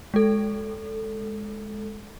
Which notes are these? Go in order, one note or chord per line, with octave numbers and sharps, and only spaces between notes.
G#3 A4